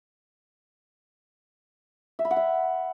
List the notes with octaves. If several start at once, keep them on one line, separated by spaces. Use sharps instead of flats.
E5
B5
F#5
E5